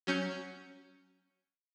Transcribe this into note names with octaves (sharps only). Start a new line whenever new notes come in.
F#3 C#4 G6 C#7